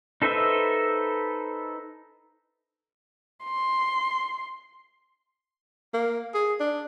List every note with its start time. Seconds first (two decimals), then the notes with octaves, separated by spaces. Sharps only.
0.22 D#4 A4 B4 C5 E5
3.44 C6
5.94 A#3
6.34 G#4
6.60 D4